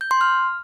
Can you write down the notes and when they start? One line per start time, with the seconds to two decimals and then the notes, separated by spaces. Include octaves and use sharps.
0.01 G6
0.11 C6
0.21 F6